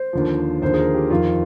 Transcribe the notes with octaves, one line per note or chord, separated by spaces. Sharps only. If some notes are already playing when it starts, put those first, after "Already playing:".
Already playing: C5
D#2 D3 F3
D#2 D3 F3 C5
G#4
A#4
G4
F2 D#3 F4